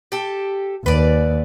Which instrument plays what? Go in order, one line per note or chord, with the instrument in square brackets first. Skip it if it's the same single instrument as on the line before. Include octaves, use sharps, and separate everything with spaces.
[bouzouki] G4 A4
[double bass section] D#2 [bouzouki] B4 D5